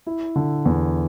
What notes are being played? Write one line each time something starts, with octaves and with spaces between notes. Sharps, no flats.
E4
D3
E2